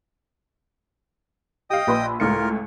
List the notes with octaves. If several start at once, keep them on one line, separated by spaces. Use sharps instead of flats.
G4 D#5 F5 G5 D#6
A#1 B4 C6
C#2 A2 F4 A#4 C#7